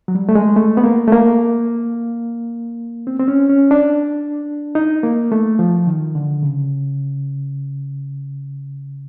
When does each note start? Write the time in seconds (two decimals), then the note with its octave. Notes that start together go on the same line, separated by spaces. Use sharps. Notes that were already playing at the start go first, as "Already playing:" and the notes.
0.08 F#3
0.15 G3
0.29 A3
0.35 G#3
0.56 A3
0.77 B3
0.84 A#3
1.08 A3
1.12 A#3
3.07 C4
3.19 C4
3.28 C#4
3.49 C#4
3.71 D4
4.75 D#4
5.03 A#3
5.32 A3
5.59 F3
5.87 D#3
6.15 D3
6.43 C#3